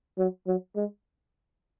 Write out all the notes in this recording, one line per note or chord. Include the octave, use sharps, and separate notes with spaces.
F#3
F#3
G#3